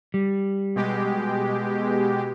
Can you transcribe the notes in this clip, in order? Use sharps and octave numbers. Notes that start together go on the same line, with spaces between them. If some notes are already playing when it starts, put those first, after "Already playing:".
G3
B2 G#3 G4